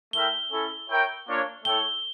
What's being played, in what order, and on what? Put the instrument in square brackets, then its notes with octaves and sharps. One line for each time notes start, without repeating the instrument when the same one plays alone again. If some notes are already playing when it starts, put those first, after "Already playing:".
[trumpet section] A3 E4 A#4 E5 G5 [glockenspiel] G7
[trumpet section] C#4 E4 A4
E4 A#4 C#5 G5
A#3 D4 F4 C#5
[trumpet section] A3 E4 A4 C#5 G5 [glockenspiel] G7